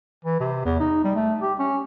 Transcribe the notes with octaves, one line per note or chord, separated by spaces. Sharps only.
E3
C3
E2
D#4
G3
A3
G4
C#4